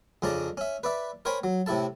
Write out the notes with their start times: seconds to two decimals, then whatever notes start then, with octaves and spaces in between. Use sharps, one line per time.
0.22 F2 C#3 C#4 D4 A5 A#5
0.57 C#4 E5
0.83 B4 D5 E5
1.25 A#4 C5 C#5 G5 G#5 B5
1.44 F#3
1.66 A2 C3 E4 A4 A5